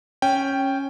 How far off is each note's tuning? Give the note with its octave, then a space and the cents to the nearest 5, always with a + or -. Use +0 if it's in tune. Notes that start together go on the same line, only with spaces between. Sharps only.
C#4 -10 G5 +0